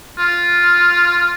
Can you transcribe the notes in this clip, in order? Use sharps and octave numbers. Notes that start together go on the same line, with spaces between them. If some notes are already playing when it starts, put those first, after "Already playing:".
F4